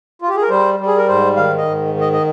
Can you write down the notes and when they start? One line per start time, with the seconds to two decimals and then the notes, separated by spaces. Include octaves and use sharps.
0.22 F4
0.29 G4
0.36 G#4
0.42 A#4
0.50 G3 C5
0.79 G3
0.87 G#4
0.97 A#4
1.08 G#2 C5
1.36 D#3 F5
1.58 D#5
1.65 G#2
1.94 D#3
2.01 D#5
2.12 D#5